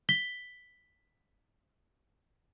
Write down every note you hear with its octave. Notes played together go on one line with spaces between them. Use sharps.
B6 G7